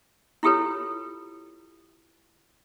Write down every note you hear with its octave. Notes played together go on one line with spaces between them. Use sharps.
E4 F4 G4 A4 B4 C#5